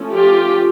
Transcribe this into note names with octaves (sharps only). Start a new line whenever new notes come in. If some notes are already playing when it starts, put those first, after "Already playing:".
Already playing: F3 A3 C#4
F4 G4